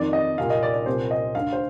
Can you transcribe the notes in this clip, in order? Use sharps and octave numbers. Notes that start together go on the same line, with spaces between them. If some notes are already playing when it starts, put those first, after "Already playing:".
Already playing: F2 D#3 D5
D#5
C2 A#2 F5
D#5
D5
D5
C2 A#2 C5
D#5
D2 D3 F5
C5